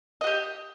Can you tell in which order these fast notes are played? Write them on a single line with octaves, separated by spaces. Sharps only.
D#5 F#4 G4